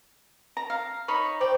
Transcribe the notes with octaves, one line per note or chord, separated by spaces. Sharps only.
A#5
F5
D#4 C#5 B5
C5 D5 G5